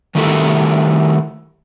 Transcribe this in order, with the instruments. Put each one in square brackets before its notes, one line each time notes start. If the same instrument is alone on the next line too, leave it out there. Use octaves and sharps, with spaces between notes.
[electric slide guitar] D#3 G3 A3 E4 F#4 A4